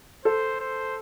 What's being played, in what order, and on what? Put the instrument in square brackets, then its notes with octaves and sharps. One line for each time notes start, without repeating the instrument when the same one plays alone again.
[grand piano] A4 [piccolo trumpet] C5
[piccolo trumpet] C5